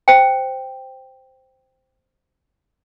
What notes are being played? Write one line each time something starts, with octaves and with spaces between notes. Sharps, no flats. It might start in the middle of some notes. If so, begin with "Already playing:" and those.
C5 G5